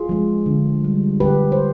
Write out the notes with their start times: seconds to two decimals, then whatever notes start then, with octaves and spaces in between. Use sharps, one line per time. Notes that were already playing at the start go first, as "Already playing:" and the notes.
Already playing: F4 G#4
0.09 F3 G#3
0.46 D3
0.84 G3
1.20 D3 G4 B4
1.52 C5